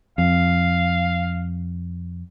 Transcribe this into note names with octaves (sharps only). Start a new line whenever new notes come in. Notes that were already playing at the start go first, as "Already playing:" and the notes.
F2 F5